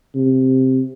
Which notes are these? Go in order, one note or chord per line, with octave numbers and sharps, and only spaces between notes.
C3